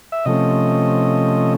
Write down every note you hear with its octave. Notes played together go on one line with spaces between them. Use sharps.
E5
C3 F3 A3 C#4 D#5